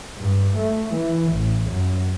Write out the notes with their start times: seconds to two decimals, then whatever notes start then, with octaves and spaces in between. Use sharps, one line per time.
0.16 G2
0.55 A3
0.90 E3
1.30 A1
1.67 F#2